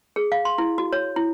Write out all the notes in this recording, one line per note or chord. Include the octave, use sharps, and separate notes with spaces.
G#4
F5
C6
E4
F#4
C#5
E4